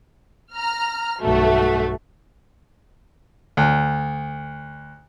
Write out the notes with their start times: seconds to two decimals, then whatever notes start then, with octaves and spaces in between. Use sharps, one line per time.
0.54 A#5 F6
1.20 B1 G2 A3 F#4
3.57 D2